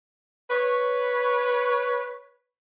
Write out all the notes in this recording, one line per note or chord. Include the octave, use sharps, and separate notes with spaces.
B4 C#5